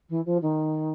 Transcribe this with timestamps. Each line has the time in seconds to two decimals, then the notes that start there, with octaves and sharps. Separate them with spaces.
0.09 E3
0.25 F3
0.42 D#3